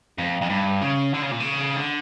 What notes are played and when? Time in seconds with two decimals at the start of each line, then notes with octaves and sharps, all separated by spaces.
0.18 F2
0.41 F2
0.50 G2
0.81 C#3
1.14 D3
1.22 C#3
1.31 A#2
1.40 C#3
1.76 D3